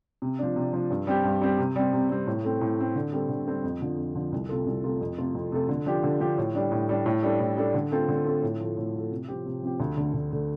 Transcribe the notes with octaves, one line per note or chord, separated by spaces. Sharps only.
C3
F3 D4
C3
F3 D4
G2
G3 C4 G4
G2
G3 C4 G4
C3
G3 C4
C3
G3 C4
A2
A3 C4
A2
A3 C4
D3
G3 C4 A4
D3
G3 C4 A4
F2
D3 F3
F2
D3 F3
C2
C3 A3 F4 A4
C2
C3 A3 F4 A4
F2
C3 A3 F4 A4
F2
C3 A3 F4 A4
D3
F3 D4 G4
D3
F3 D4 G4
A2
G3 D4
A2
G3 D4
A2
G3 D4 A4
A2
G3 D4 A4
D3
A3 C4 F4 A4
D3
A3 C4 F4 A4
A2
F3 A3
A2
F3 A3
C3
F3 C4 G4
C3
F3 C4 G4
D2
D3 A3
D2
D3 A3